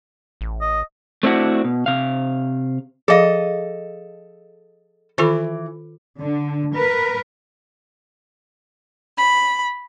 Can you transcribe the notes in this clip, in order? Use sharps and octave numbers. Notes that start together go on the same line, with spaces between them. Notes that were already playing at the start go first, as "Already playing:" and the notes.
A1
D#5
A3 C4 D4 E4 F#4
B2
C3 F5
F3 G#4 A4 D#5 F5
D#3 E3 F4 A4
D3
A#4 B4
B5